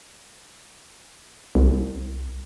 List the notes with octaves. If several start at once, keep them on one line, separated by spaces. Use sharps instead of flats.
C2